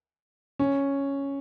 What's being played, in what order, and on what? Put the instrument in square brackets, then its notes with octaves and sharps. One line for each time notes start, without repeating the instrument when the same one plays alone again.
[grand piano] C#4